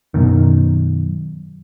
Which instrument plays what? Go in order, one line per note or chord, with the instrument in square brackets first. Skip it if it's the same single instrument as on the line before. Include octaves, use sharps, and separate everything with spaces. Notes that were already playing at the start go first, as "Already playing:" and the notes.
[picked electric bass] F#2 B2 D#3